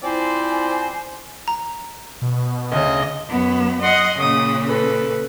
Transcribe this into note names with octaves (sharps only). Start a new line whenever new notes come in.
C4 E4 F4 C5 D5 G#5
A#5
B2
D2 C#3 D#5
F#2 B3
D#5 F#5 C6
A#2 C#3 D#6
A4 B4